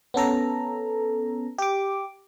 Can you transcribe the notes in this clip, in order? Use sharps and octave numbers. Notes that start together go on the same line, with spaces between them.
B3 C#4 A4 A#5
G4 D6